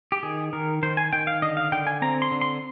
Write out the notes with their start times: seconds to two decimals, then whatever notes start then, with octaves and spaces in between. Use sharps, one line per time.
0.12 G4
0.23 D#3 G#4
0.53 D#3 A#4
0.83 D#3 C5
0.97 G#5
1.13 D#3 G5
1.27 F5
1.42 D3 D#5
1.57 F5
1.72 D3 G5
1.87 G#5
2.02 C4 A#5
2.22 C6
2.31 D3
2.41 C6